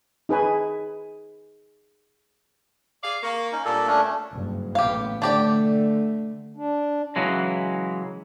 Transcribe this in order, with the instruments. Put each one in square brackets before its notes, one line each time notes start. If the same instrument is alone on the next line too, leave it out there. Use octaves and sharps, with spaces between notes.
[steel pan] D#4 G#4 B4 G#5
[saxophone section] G#4 D5 F5
[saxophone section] A#3 [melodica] C#6
[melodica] C#4 D#4
[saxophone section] G2 A#2 [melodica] A4
[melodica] A3 C#4 D4
[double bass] F#1 G2
[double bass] A1 B3 [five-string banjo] G4 F5
[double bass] D3 A3 [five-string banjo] D4 G4 D5
[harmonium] D4
[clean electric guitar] C#3 E3 F#3 G#3